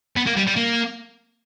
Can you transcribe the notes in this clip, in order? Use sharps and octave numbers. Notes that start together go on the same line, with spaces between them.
B3
A#3
G3
G3
A#3